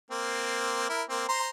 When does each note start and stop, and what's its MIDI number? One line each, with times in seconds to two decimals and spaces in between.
0.11 0.88 58
0.11 0.88 60
0.89 1.03 64
0.89 1.03 70
1.09 1.26 58
1.09 1.26 60
1.29 1.50 72
1.29 1.50 82
1.29 1.50 84